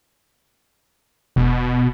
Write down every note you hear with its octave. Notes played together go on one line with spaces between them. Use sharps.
E1 B2